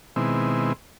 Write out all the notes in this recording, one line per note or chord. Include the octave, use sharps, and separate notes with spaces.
B2 D#3 G#3 C4 E4